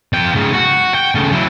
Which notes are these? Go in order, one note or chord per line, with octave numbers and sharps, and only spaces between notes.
F2 G5
G#2 C#3
F#4
G5
C#3 A3
F#3 E4